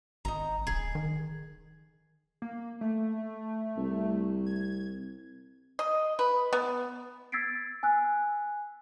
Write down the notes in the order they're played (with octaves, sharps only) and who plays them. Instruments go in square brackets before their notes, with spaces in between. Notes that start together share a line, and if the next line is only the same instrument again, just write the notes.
[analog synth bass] G#1 [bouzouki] D#4 A#5
[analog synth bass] D1 [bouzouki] G#4
[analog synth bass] D#3
[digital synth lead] A#3
A3
[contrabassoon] C2
[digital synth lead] G#6
[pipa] D#5
B4
B3
[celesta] E6 G#6 A6 B6 C7 D7
G#5 E6 F#6